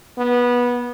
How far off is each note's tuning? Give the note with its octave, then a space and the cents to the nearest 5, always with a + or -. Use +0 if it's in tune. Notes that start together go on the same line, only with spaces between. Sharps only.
B3 -20